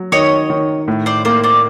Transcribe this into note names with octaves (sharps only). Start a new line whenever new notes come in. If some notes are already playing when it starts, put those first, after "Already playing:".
Already playing: F#3
D#3 C#5 D#5
D#3
A2
C5 D5
A#3 C5 D5
C5 D5